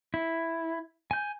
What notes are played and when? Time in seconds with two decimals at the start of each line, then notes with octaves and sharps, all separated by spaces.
0.14 E4
1.11 G#5 G6